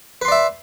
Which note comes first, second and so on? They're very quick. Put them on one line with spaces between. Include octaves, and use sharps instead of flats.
B4 C6 D5 E5